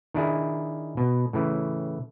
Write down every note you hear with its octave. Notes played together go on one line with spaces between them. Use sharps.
D#3 D4 E4 G#4
B2
A2 C#3 E3